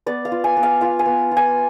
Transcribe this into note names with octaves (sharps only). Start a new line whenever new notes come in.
B3 D5
F5
F4
G#5
B3
F5
F4 F5
G#5
B3
F4
G#5